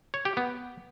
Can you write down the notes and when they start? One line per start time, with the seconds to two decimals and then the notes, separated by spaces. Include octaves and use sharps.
0.14 C#5
0.25 G4
0.37 B3